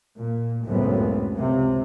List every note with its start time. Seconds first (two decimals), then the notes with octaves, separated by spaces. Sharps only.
0.17 A#2
0.66 C#2 F#2 A2 C#3 B3 C4
1.35 C#2 C3